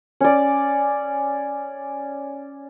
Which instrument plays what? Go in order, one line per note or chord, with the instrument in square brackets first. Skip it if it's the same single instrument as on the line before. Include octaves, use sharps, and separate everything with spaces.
[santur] C#4 D5